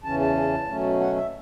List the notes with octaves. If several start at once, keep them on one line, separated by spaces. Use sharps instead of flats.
E2 C#3 E3 C#4 A5
A5
B2 F#3 A3 C#4
F#5
E5